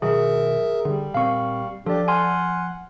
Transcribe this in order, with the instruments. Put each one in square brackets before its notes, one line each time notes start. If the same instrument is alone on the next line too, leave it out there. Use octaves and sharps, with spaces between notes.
[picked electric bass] B2 D#3 F#3 [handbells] G#4 [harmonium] A#4 E5
[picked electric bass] D3 [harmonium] G3
[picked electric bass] A#2 C4 [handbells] F5 C#6
[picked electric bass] F3 [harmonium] D4 G4 [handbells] A4 D5
[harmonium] F#5 [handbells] G#5 C6 F6